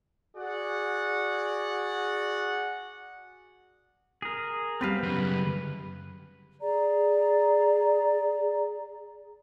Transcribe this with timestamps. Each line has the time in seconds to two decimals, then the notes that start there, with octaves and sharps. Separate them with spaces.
0.37 F#4 G#4 D5 F#5
4.22 G#4 A#4
4.81 G3 B3 C4 B4 F5
5.03 F#2 C#3 B4
6.61 G#4 D5 A#5